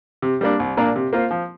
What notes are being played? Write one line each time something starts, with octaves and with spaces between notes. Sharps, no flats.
C3
G3 A#3 D4
C2
A#2 A#3 D4 A#4
C3
A#3 F4 C5
F3